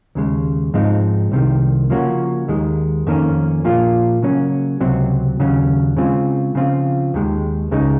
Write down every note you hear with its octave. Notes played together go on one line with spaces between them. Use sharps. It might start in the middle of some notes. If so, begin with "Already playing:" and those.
D#2 C#3 G#3
G#2 F3 G#3 C4 D#4
C2 C3 D#3
C#3 F3 A#3 C#4 F#4
D#2 D#3 G#3
F2 D#3 A#3 C#4
A#2 F3 A#3 F4
C#3 F#3 A#3 C#4
C#2 C3 F#3 C4
D#2 C#3 F#3 C#4
C#3 G#3 C4 F4
C#3 F3 C4 F4
D#2 D#3 G#3
C#2 C#3 G#3 D#4